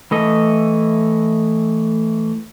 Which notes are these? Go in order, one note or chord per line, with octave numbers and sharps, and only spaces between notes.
E3 A3 D#5